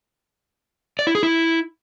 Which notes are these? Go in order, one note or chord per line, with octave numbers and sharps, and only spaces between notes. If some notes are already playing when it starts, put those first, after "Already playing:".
D5
E4
G#4
E4